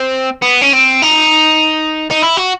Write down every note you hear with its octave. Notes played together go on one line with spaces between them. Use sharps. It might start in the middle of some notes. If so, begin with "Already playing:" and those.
Already playing: C4
B3
C#4
C4
D#4
D#4
E4
F#4